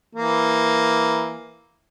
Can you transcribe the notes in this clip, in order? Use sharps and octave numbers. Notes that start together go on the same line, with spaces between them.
E3 A#3